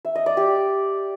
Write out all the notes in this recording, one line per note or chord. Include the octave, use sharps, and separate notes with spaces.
E5
D#5
D5
G4